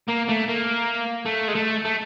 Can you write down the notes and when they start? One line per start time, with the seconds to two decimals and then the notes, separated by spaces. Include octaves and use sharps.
0.08 A#3
0.28 A3
0.48 A#3
1.25 A3
1.48 G#3
1.55 A3
1.85 A3